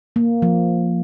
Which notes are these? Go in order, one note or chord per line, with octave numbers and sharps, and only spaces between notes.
A#3
F3